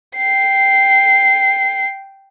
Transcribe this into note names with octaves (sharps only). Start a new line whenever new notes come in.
G5 C7